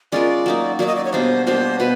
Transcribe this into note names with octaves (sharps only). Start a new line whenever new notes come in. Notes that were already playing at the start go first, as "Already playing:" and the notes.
G#3 C#4 F4 A#4 D5
F#3 A#3 D#4
F#3 A#3 D#4 D5
D#5
D5
C#5
B2 G3 A#3 D4 C5
B2 G3 A#3 D4 C5
B2 B4